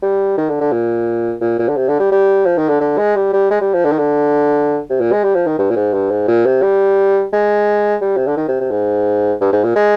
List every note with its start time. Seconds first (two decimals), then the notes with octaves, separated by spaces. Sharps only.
0.02 G3
0.38 D#3
0.50 D3
0.60 D3
0.72 A#2
1.41 A#2
1.59 A#2
1.68 D3
1.76 C3
1.88 D3
1.99 G3
2.12 G3
2.45 F3
2.57 D#3
2.69 D3
2.81 D3
2.98 G#3
3.15 G3
3.33 G3
3.51 G#3
3.61 G3
3.74 F3
3.84 D3
3.91 D#3
3.98 D3
4.90 C3
5.00 A#2
5.12 G#3
5.23 G3
5.35 F3
5.46 D#3
5.59 G2
5.70 A#2
5.76 G#2
5.93 G2
6.11 G#2
6.28 A#2
6.46 C3
6.63 G3
7.33 G#3
8.01 G3
8.17 C3
8.27 D3
8.37 D#3
8.48 C3
8.60 C3
8.71 G#2
9.41 G2
9.52 G#2
9.64 A#2
9.76 G#3